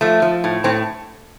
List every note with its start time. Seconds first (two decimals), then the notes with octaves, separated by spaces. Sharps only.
0.01 F3 A3
0.22 F3
0.44 A2
0.64 A2 C4